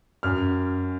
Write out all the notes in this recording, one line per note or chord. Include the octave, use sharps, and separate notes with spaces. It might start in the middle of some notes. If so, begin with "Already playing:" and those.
F#2 F6